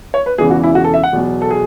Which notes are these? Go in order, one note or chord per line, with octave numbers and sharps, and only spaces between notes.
C#5
B4
E1 E2 C#3 E3 G#4
F#4
E4
F#4
A4
E5
F#5
E2 B2 F#3
A4
G#4